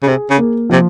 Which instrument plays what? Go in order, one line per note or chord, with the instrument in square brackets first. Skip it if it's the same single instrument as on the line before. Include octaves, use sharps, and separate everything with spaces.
[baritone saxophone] C#3
[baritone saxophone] C3 [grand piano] G#4
[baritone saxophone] C#3
[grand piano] A#3
[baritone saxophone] C3 [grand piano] F3